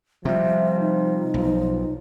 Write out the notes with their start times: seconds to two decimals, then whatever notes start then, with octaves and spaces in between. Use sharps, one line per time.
0.25 C3 F3 G3 E5
0.80 D#4
1.34 B1 F3